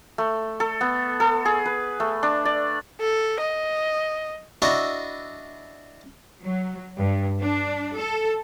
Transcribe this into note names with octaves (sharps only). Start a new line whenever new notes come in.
A3
A4
B3
A4
G#4
B4
A3
D4
D5
A4
D#5
D4 E4 F#4 D#5 E5
F#3
G2
D4
A4